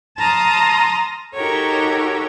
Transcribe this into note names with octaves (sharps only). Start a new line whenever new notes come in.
A5 A#5 C6 D#6 F6
D#4 F#4 G4 A4 A#4 C#5